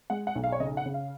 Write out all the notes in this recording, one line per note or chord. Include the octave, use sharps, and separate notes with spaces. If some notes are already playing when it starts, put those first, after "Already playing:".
G#3 F#5
F#5
B1
F5
C#5
C#3 D#5
F#5
C#3
F5